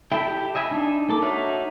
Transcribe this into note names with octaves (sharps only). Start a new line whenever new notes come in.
E4 A4 E5 G5
G4
D#5 E5 G#5 B5
D4 D#4
A#3 A4 D6
D#4 F#4 C#5 E5 F6